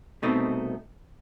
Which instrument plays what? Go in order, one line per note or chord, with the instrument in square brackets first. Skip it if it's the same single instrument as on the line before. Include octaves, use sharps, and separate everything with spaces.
[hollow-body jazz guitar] C2 B2 A3 C4 D#4